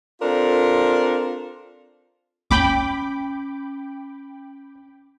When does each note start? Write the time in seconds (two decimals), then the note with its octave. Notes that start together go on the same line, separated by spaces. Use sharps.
0.21 C4 D4 F4 A4 A#4
2.51 C#4 G5 B5 D6